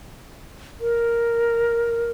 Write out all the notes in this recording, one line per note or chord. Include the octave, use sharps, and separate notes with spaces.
A#4